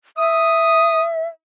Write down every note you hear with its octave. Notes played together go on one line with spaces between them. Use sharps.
E5 D#6